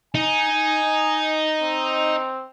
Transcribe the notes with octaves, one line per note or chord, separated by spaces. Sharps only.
D#4 G#5
C4